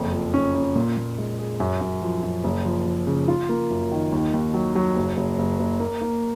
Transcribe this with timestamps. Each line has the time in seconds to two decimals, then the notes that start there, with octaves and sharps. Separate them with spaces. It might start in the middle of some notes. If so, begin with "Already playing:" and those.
Already playing: F#1 F2
0.12 F3
0.34 C#4
0.55 C#4
0.75 A#2
0.97 A#2
1.18 G#3
1.39 G#4
1.60 F#2
1.81 F#2
2.02 F3
2.23 F#2
2.44 F#1
2.65 F3
2.86 F3
3.07 C#3
3.28 F4
3.49 A#3
3.70 F#2
3.92 D#3
4.12 D#2
4.33 D#2
4.54 F#3
4.75 F#3
4.96 F#1
5.17 F#1
5.39 F#1
5.59 F#1
5.80 A#3
6.01 A#3